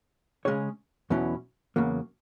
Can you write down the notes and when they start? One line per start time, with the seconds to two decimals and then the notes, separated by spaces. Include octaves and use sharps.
0.45 C#3 G#3 C#4 G#4 C#5
1.10 E2 B2 F#3 C#4 E4
1.76 E2 C#3 F#3 A#3